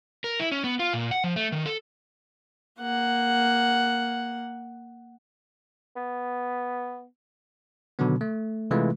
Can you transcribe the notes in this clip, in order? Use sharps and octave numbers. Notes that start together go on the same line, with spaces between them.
A#4
E4
C#4
B3
F4
A#2
F#5
F3
A3
D#3
A4
A#3 F#5
B3
B2 D3 D#3 F#3 B3
A3
C3 E3 G#3 A3 F4 B4